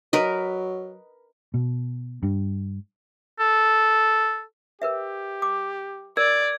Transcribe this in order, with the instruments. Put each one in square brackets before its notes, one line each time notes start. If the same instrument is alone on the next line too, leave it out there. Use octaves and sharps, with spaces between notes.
[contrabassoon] F#3 [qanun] A#4 B4 D#5
[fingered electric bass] B2
G2
[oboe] A4
[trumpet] G4 [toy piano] A#4 B4 E5
[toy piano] D6
[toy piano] A#4 [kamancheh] D5 [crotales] G#6